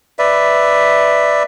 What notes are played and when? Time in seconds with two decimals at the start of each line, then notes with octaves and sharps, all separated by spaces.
0.19 B4 D5 E5